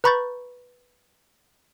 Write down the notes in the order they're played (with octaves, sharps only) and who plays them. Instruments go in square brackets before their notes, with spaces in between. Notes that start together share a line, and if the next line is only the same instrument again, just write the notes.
[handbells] B4 A#5 B5 C#6 G6 A6